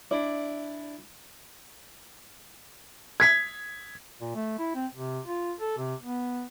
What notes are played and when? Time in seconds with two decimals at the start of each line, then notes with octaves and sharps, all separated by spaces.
0.11 D4 E4 D5
3.20 G#6 B6
4.21 A#2
4.35 A3
4.59 E4
4.75 C4
4.94 C3
5.26 F4
5.59 A4
5.78 C3
6.02 B3